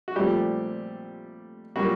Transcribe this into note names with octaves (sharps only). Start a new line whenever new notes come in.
F#4
A#2 F3 G3 A3 C4 G4
A#2 F#3 G3 A#3 F#4